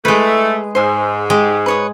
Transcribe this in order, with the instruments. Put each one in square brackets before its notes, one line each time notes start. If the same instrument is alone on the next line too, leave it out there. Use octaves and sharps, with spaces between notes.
[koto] G#3 B4 [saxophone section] A3 [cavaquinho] E4
[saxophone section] G#2 [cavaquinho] C5 G#5
[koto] G#3 [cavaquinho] G4
[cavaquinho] B4 C#5 D#6